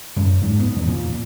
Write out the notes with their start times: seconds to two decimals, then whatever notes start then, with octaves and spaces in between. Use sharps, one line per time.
0.16 F#2
0.42 G#2
0.60 B3
0.76 E2
0.88 A#2